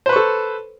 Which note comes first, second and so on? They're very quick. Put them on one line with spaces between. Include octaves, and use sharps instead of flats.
C5 B4 C#6 A4